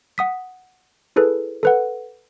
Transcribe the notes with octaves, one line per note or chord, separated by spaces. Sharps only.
F#5 D#6 B6
E4 G#4 A4 B4
A4 B4 F#5